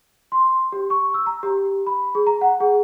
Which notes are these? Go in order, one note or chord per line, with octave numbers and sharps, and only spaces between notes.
C6
G4
C#6
E6
A#5
G4
B5
G#4
A#5
F#5
G#4